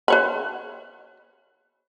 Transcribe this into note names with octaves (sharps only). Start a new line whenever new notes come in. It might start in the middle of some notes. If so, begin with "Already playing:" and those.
B4 C#5 B5